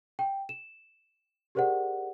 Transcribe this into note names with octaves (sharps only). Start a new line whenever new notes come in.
G5
E7
G4 G#4 A#4 C5 D5 F#5